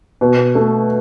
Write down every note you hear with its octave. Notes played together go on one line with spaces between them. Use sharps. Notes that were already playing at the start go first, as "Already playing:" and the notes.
B2
A3